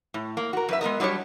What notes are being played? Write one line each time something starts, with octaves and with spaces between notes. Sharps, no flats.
A2
A#3
F#4 A#4
F#2 B4 E5
G#3 B3 A#4 D#5
F#3 G3 D4 G4 C#5